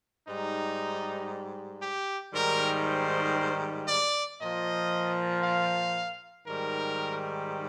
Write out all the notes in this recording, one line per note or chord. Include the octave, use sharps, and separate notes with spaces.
G#2 G3 D#4
G4
G#2 D#3 G3 A#4
C5
D5
A#2 F3 D#5
F5
G#2 D#3 G3 A#4